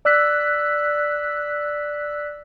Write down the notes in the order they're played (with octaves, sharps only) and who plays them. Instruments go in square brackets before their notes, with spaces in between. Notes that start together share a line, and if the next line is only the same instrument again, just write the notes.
[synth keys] D5 E6 F#6 B6